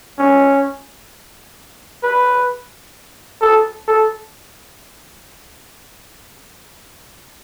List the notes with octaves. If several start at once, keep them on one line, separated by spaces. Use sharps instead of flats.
C#4
B4
A4
A4